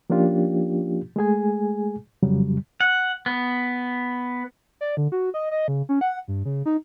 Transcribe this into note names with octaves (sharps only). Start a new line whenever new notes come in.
F3 A#3 C#4 D4 F4 G4
G#3 A3 G#4 G#5
F2 C#3 F#3 G3
F#5
B3
D5
D3
F#4
D#5
D#5
C#3
C#4
F#5
G2
C#3
D#4